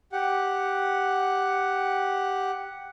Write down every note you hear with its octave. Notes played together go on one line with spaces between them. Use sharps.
G4 F#5